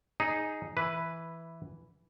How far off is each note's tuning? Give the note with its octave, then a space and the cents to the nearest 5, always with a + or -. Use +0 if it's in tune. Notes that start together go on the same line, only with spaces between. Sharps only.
D#4 +0 G#4 +0
E3 +0 B4 +0